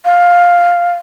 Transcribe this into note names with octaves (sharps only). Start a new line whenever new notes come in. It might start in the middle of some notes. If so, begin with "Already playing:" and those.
F5